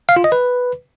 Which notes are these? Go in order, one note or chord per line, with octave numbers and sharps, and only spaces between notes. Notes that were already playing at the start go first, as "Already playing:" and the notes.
F5
F4
D#5
B4